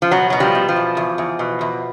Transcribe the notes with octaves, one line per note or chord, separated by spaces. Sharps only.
F3
B2 F#3
B2 F#3
F3 G3
B2
F3
E2
E2
E2
B2
E2